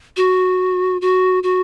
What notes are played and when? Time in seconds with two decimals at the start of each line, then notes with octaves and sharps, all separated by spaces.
0.17 F#4
1.01 F#4
1.43 F#4